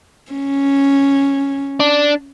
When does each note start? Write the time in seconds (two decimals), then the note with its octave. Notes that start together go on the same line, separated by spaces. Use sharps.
0.32 C#4
1.80 D4